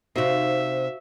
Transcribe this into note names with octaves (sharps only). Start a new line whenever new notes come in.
C3 D#4 F#4 C5 E5 F5